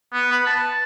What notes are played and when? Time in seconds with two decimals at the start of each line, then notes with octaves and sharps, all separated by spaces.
0.13 B3
0.32 B4
0.47 A5